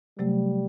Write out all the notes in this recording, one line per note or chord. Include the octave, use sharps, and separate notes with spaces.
C3 F#3 G3 A3